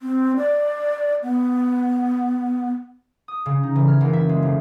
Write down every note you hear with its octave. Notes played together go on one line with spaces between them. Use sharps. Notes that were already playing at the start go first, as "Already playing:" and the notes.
C4
D5
B3
D#6
C#3
D#4
E3
F6
F#1
E5
G#3
F1